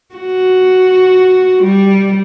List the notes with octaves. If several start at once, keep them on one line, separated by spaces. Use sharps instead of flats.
F#4
G3